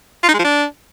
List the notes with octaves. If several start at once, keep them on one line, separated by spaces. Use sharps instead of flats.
F4
D#4
G#3
F3
D4